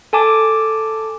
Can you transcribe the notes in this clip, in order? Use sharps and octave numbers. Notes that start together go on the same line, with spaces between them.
A4 G#5 A5 D6